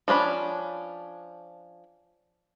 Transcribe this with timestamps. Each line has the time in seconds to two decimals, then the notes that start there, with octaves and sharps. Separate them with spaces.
0.08 F3 C#4 D4 B5